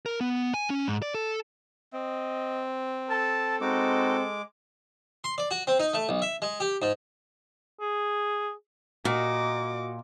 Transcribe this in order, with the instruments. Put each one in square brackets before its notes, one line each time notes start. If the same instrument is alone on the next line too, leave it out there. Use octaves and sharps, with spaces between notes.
[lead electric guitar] A#4
B3
G#5
C#4
G#2
D5
A4
[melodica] C4 [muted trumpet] D#5
[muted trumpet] A4 [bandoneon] A5
[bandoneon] G#3 D6 [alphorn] C4 [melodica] D#4 F#4
[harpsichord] C6
D5
F#4
C4
D#4
A3
B1
E5
G#3
G4
G#2
[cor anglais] G#4
[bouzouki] A#2 [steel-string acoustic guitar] F#4 [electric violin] D#5 D6